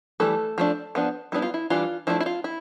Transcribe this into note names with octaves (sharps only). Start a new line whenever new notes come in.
E3 G3 A3 A4
F3 A3 D4
F3 B3 D4
G3 B3 D4 E4
F4
E4
E3 G3 D4 F4
F3 A3 D4 E4
E4
F4
E4